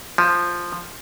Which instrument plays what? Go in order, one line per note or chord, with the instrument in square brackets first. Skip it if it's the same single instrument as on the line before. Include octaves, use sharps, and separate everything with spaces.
[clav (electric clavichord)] F3